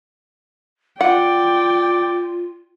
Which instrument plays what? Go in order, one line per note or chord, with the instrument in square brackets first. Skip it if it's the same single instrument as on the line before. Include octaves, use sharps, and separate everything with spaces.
[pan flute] F4 [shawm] D5 [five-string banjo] F#5 [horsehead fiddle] G5